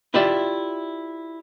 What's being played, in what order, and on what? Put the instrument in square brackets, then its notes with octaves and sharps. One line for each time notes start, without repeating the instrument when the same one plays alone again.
[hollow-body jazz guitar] E4 F4 G4 D5 E5